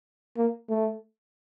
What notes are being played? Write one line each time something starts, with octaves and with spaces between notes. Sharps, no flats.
A#3
A3